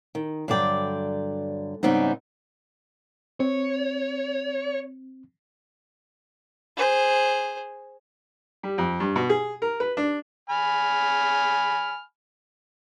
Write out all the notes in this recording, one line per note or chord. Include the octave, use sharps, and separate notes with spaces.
D#3
G2 D3 F#3 D5 G5
G#2 C#3 G3 B3 C4 D#4
C4 C#5
G#4 C5
G3
F2
G2
B2
G#4
A#4
B4
D4
G#5 B5 F6